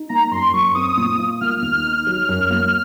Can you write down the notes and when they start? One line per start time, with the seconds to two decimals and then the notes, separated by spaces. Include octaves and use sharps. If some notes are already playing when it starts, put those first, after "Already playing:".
Already playing: D#4
0.09 A#3 A#5
0.31 F#2 C6
0.53 F#2 C#6
0.75 C4 D#6
0.97 A#2
1.19 F4
1.41 A#3 F6
1.59 D#2 F6
1.84 D#4
2.07 F#3
2.29 F#2
2.51 A#3